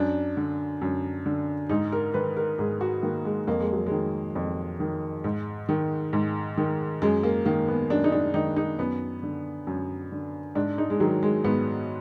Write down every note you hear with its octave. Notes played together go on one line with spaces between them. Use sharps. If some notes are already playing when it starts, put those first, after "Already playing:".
Already playing: F#2 D4
D3
F#2
D3
G#2 D#4
A#4
D#3 B4
A#4
G#2 G#4
F#4
D#3 A#3
G#3
F2 A#3
G#3
F#3
D#3 G#3
F2
D#3
G#2
D#3
G#2
D#3
F#2 G#3
A#3
D#3 A#3
B3
F#2 D4
D#4
D4
D#3 D#4
D#4
F#2 B3
D3
F#2
D3
G#2 D4
D#4
G#3
D#3 F#3
G#3
G#2 B3